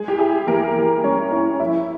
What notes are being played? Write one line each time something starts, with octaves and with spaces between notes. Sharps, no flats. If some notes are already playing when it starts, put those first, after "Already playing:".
Already playing: G#3 G#4
G4
E4 G#4
E3 A#3 A#4
E3
G#3 C#4 C#5
C#4 E4 C#5
F3 E4 E5